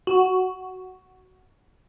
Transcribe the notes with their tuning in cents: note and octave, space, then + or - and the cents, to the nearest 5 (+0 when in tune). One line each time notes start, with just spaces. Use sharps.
F#4 +5